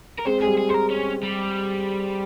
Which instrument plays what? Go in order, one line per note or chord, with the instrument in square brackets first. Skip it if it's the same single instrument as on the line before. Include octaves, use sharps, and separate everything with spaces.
[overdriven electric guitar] A#4
[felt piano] G#3 C4 [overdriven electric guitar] C5
[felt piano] G#3 [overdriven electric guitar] G#4
[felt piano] G3
[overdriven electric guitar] G#4
[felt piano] G#3 [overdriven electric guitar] A#4 C5
[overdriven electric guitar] C#4
G3